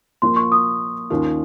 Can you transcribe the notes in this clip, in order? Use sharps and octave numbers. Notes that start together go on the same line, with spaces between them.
A#2 F3 A#3 C6
C#6
D#6
D#2 D#3 A#3 C#4 F4